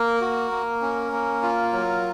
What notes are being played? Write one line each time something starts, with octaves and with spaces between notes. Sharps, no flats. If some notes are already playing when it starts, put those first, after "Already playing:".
Already playing: A#3 A#4
F#4
A#3
C#4
A#3
F4
F#3